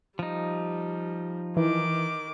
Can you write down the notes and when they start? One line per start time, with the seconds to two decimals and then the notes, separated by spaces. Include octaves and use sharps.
0.19 F3 G3 D#4
1.57 D#3 E3 D6